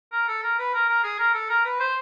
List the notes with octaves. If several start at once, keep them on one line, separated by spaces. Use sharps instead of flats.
A#4
A4
A#4
B4
A#4
A#4
G#4
A#4
A4
A#4
B4
C5